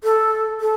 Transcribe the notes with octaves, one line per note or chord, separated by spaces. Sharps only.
A4
A4